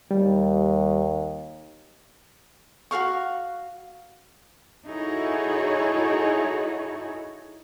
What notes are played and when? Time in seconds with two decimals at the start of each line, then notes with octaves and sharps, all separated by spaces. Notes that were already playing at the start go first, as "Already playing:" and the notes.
0.11 D#2 G3
2.91 F#4 A#4 F5 C#6
4.86 D#4 E4 F#4 G#4 A4 C#5